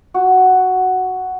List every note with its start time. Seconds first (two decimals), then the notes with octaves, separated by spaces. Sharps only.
0.14 F#4